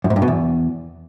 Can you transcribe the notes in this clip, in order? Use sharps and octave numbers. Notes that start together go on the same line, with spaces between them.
F#2
G#2
G2
B2
E2